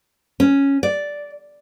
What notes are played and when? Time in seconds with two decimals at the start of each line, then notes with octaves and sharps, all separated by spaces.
0.40 C#4
0.83 D5